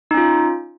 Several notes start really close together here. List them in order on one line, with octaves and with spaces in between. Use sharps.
D#4 C#4 F4